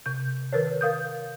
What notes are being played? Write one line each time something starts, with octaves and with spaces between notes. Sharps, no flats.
C3 G6
D#3 A#4 B4 C#5
A#4 F5 D#6 G6